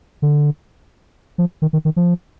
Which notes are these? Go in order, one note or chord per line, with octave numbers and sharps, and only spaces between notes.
D3
F3
D#3
D#3
D#3
F3